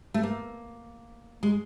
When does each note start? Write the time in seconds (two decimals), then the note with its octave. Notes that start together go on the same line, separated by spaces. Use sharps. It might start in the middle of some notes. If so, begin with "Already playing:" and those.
0.14 A3
0.23 A#3
1.43 G#3